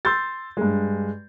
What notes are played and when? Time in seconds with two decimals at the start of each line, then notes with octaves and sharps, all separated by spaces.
0.05 C6 E6 G6 A6
0.57 G2 G#3